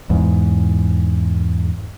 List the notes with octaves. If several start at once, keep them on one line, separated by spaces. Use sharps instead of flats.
E2 G#2